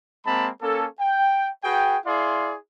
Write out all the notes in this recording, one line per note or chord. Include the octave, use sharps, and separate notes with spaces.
G#3 A#3 C4 A5 B5
A#3 C#4 A4
G5
F#4 G#4 B4 G5
E4 G#4 D5 F5 C6